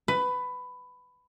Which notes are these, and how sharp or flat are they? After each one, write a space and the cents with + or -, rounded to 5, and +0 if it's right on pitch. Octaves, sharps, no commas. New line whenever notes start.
B4 +15